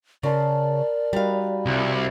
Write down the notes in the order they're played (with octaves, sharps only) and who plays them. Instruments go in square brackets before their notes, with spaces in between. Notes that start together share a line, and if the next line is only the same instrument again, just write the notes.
[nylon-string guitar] C#3 [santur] A#4 A5 C6 [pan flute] D5
[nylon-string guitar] G3 F5 [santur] D#4 F#4 B4
[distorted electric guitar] C2